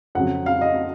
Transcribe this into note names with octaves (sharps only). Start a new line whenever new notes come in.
F2 C#3 F#3 F#5
F5
D#5